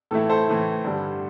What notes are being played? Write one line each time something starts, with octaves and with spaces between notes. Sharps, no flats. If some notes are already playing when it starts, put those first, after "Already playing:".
A2 E3 A3 E4 A4
A4 C5
A2 E3 A3 E4
G2 D3 G3